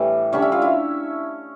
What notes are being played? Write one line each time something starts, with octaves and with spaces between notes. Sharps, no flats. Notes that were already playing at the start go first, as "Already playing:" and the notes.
Already playing: A2 E3 G3
D3 G3 C#4 C#5
E4 E5
F4 F5
E4 E5